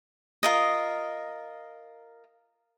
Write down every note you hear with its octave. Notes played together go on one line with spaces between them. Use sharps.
F4 A#4 D#5